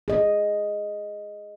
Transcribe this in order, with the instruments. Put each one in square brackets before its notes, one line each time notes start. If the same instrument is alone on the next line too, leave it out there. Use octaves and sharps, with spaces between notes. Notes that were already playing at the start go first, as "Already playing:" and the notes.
[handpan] G#4 D#5